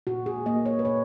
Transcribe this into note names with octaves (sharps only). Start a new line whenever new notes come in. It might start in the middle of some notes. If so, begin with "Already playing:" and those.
A#2 F#4
G#4
A#3 D#5
C#5
B4
A#2 C#5